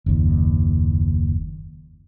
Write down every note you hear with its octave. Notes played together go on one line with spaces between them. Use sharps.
F#1 D#2